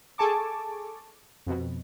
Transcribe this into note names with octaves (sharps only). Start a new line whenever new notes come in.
G#4 A4 G#5 A5 C#6 D6
F2 B2